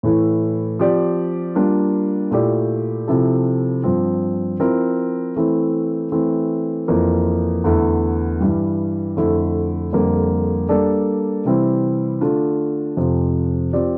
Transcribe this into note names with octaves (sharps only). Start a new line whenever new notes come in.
A2 E3 A3 E4
F3 C4 G4 D5
G3 A#3 D4 F4
A#2 A3 E4 G4 D5
C3 F3 C4 E4 A4
G2 F3 C4
F3 C4 E4 A#4
E3 A3 C4 E4
E3 A3 C4
F2 E3 A#3 F4
E2 D3 A3 E4
G2 E3 G3
F2 D3 A3 E4
F2 D3 G3 A#3
G3 A#3 D4 A4 D5
C3 E3 G3 C4 E4
D3 A3 D4 F4
F2 C3 F3
F3 C4 G4 D5